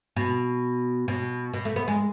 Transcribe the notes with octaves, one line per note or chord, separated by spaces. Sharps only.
B2
B2
B2
A3
B3
G#3